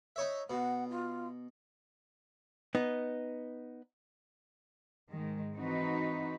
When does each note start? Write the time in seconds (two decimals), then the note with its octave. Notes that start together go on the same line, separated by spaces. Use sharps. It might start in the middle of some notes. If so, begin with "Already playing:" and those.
0.16 D#4 C#5 E5
0.50 B2 F#5
0.90 F4
2.75 B3 D#4
5.11 G#2 D#3 G#3
5.54 E3 C4 D#4 F#4 B4